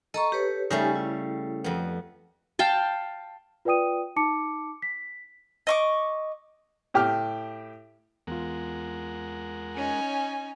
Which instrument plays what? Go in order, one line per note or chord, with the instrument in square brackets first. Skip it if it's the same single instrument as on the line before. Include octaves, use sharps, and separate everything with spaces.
[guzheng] A4 [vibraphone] D#5 A#5 C#6
[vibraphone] G4 B4 C#5
[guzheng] C#3 G3 A3 [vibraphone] D#4 G4 G#5
[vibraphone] E4
[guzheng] F2 B3
[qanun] F5 G5 A5
[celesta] F4 B4 D5 G5 D#6 D#7
D#4 A5 D6 C#7
B6
[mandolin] D#5 C#6 D6
[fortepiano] A2 G4 D6 F6
[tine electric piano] E2 F4 [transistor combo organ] G#3 A#4 F#5
[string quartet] C#4 D#4 C#5 [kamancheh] G#5